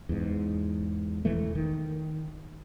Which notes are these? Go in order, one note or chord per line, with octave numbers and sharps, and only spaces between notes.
E2 G#2
E1 E3 A3
D#3